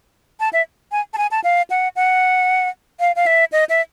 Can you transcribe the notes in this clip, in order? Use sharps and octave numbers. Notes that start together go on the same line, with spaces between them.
A5
E5
G#5
A5
G#5
A5
F5
F#5
F#5
F5
F5
E5
D#5
E5